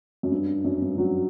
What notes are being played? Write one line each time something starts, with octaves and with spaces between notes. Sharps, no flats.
F#2
G2
F#2
G2
F#3